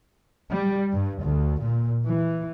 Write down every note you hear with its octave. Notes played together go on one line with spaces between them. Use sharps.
G3
G2
D2
A#2
E3